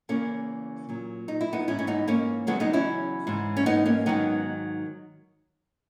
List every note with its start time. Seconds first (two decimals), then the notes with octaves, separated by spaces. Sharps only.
0.09 E2 C#3 E3 A#3 C#4
0.89 A#2 F#3
1.28 D#4
1.41 E4
1.53 B3 D#4
1.68 G#2 E3 C#4 E4
1.79 C#4
1.87 B3 D#4
2.08 A#3 C#4
2.47 E2 C#3 F#3 G#3 B3
2.60 B3 D#4
2.73 C#4 E4
3.27 G#2 E3
3.57 C#4
3.66 B3 D#4
3.86 A#3 C#4
4.06 G#2 D#3 F#3 B3 D#4